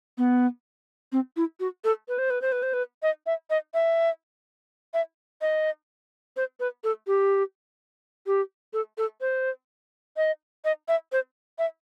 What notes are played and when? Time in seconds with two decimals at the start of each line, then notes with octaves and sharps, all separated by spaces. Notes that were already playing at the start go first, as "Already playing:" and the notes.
0.18 B3
1.12 C4
1.37 E4
1.60 F#4
1.84 A4
2.09 B4
2.18 C5
2.30 B4
2.42 C5
2.52 B4
2.63 C5
2.73 B4
3.02 D#5
3.26 E5
3.50 D#5
3.74 E5
4.94 E5
5.41 D#5
6.37 C5
6.60 B4
6.84 A4
7.07 G4
8.26 G4
8.73 A4
8.98 A4
9.21 C5
10.17 D#5
10.65 D#5
10.88 E5
11.12 C5
11.59 E5